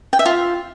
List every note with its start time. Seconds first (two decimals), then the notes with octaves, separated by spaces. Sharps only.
0.13 G5
0.19 E5
0.26 F4